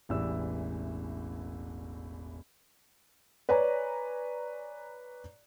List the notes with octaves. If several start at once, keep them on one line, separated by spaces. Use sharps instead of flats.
E1 A1 E3 G4 D5 E6
B4 C#5 D5 G#5 A#5